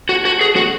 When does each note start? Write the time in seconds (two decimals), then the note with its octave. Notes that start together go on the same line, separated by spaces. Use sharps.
0.09 F#4
0.25 F#4
0.41 G#4
0.56 F#4